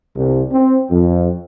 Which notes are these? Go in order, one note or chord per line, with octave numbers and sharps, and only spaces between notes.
C2
C4
F2